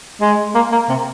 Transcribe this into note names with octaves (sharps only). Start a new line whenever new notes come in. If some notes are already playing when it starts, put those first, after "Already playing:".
G#3
A#3
A#3
C3